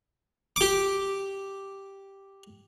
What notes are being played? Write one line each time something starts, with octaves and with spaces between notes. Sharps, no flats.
G4 D6